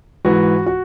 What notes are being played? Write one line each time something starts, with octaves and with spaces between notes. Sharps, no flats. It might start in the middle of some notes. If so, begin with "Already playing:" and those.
G#2 E3 F#4
F#4